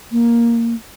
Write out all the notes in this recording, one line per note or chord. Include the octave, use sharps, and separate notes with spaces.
A#3